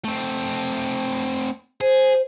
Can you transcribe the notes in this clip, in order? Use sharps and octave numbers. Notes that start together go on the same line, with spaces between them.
A3 C4
G#4 C5